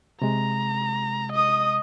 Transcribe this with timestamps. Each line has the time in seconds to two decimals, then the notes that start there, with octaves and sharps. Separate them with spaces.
0.22 C3 G#3 A#5
1.32 D#5 D#6